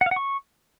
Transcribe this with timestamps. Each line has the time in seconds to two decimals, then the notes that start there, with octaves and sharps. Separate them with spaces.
0.01 F#5
0.06 F5
0.11 F#5
0.16 C#6